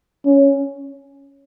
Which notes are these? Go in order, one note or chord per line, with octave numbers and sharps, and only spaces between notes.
C#4